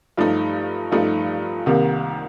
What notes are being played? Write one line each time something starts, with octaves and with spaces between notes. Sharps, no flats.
G2 F3 A3 D#4
G2 F3 A3 D#4
C2 C3 D#3 A#3